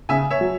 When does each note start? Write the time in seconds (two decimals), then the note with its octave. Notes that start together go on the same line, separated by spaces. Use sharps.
0.09 C#3 E5 G#5
0.30 C#5 E5
0.41 F#3